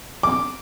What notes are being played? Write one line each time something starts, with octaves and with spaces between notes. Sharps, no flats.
D6